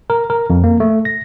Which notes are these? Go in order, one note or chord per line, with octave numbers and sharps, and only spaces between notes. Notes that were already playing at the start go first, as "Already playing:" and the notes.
A#4
A#4
F2
A#3
A3
A#6